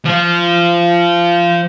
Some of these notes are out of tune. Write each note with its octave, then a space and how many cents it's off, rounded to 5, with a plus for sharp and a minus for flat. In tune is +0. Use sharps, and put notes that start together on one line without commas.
F3 -20